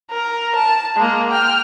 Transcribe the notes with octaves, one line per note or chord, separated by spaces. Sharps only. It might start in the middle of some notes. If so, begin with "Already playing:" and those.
A#4
A5
G#3 A#3
G5 F6